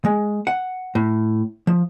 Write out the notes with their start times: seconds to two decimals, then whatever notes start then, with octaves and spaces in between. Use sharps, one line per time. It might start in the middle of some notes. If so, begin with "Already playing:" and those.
0.05 G#3
0.47 F#5
0.95 A2
1.67 F3